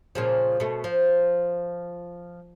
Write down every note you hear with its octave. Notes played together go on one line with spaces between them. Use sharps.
A#2 C#3 F3
B2 A3
F3